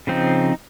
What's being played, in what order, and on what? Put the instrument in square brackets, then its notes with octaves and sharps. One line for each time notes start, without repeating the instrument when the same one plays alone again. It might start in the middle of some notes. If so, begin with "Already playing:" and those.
[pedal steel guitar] C#3 F3 C4 D#4